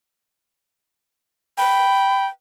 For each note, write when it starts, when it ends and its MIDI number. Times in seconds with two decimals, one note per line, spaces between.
1.58 2.31 79
1.58 2.25 83